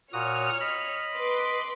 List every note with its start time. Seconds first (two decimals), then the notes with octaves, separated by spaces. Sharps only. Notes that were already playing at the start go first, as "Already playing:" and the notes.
0.13 A#2 F#4 C#5 D#6 F6
0.61 D#5 B5
1.17 B4 C6 D6